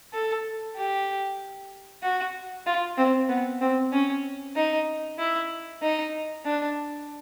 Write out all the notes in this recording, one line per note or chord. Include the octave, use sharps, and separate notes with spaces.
A4
G4
F#4
F4
C4
B3
C4
C#4
D#4
E4
D#4
D4